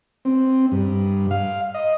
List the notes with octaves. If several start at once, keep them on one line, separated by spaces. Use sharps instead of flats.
C4
G2
F5
D#5